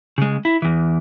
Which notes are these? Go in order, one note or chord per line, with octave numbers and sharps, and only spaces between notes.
C#3 G#3
E4
E2 E3